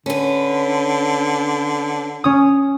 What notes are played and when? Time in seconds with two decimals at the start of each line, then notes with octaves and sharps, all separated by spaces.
0.06 D3 C#4 B4
2.24 C#4 D#6